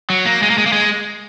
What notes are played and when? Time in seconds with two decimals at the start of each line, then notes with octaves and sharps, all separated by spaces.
0.10 F#3
0.26 A#3
0.42 G#3
0.50 A#3
0.58 G#3
0.66 A#3
0.73 G#3